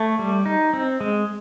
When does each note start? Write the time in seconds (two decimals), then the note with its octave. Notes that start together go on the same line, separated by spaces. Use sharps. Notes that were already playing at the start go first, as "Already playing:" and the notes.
Already playing: A3 C#5
0.19 G3
0.46 D#4
0.73 C4
1.01 G#3